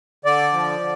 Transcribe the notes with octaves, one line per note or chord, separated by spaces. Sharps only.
D3 D5
F3
D3